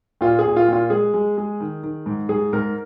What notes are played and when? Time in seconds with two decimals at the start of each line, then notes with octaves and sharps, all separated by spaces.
0.21 A#2 F4
0.39 G#4
0.44 A#2
0.56 F4
0.68 A#2 F4
0.90 G#3 G#4
1.14 G#3
1.37 G#3
1.60 D#3
1.83 D#3
2.06 G#2
2.29 G#2 G#4
2.53 G#2 A#4